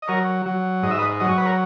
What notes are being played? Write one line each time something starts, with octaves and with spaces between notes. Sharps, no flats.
D#5
F#3 A#4 C#5
F#3
G#2 D#5
E5
B4 D#5
F#3 D#5
C#5
B4
A#4 C#5